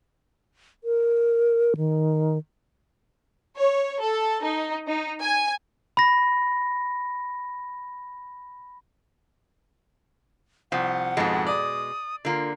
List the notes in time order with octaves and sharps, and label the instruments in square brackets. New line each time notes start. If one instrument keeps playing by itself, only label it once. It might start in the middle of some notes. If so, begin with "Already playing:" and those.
[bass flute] A#4
D#3
[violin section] C#5
A4
D#4
D#4
G#5
[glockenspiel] B5 A#6
[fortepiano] C2 [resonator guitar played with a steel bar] F3 [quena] F#5
[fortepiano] F2 G#2 [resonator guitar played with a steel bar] B2 G#3
[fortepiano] D5 [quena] D#6
[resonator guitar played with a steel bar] D3 A#3 [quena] F4